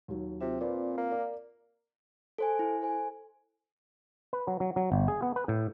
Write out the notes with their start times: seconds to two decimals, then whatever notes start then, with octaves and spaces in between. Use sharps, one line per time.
0.08 D#2 F#3
0.41 C3 C4 F4
0.60 A#2 B4 C5 D5
0.97 A#3
1.11 A#4 D5 A#5
2.38 A4 C5 G#5
2.59 E4
2.82 A4 C5 G#5
4.33 B4
4.48 F#3
4.60 F#3
4.76 F#3
4.92 G1
5.08 G#4
5.22 B3
5.36 B4
5.48 A2